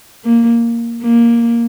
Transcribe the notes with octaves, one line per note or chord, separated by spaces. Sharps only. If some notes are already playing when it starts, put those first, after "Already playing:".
A#3
A#3